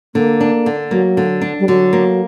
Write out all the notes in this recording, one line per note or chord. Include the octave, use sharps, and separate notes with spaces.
D3 A#3
D4
D3
F#3 A#3
D3
D4
G3
D3 F#3
A#3